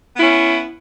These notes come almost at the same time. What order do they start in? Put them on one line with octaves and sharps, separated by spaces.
B3 E4 C#4